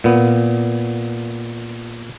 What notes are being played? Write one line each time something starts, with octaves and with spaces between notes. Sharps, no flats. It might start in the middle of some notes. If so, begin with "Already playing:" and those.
A#2 B3